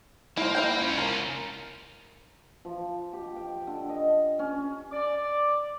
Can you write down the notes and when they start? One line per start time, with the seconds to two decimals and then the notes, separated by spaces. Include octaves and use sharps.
0.37 A#3 E4 C5
0.55 E4 F5 G5
0.81 C#4 F4
0.98 A#4
2.65 F3
3.13 G4
3.36 G5
3.67 D3
3.89 D#5
4.39 C#4
4.92 D5